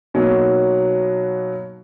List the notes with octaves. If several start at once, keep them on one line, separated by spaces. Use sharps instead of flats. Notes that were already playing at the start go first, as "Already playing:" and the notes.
B2 F#3 A#3 D#4 F#4